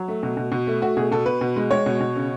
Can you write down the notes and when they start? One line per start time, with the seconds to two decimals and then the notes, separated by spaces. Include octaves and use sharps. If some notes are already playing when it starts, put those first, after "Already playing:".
Already playing: F#3
0.08 A3
0.23 B2
0.37 B2
0.52 B2
0.67 A3
0.82 A3 F#4
0.97 B2 G#4
1.12 B2 A4
1.26 B2 B4
1.41 B2
1.56 G#3
1.70 G#3 C#5
1.86 B2
2.01 B2
2.16 C#3